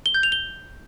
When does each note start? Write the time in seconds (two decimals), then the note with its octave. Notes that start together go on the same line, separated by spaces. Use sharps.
0.06 G7
0.14 G6
0.23 F7
0.32 G7